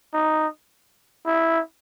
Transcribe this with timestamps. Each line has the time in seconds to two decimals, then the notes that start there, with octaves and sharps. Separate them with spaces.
0.13 D#4
1.26 E4